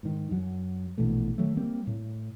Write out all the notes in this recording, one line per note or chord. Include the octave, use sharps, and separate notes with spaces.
G#2 D#3
F#2 F#3
A#1 B2 E3 A3
D#3 F#3 A3
G3 A#3 C4
A2